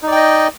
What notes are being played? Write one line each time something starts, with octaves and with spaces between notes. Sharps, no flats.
D#4 D5 D#5 G5